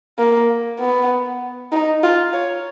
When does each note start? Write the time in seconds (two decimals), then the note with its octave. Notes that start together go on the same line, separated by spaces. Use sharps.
0.18 A#3
0.80 B3
1.72 D#4
2.03 F4
2.33 C#5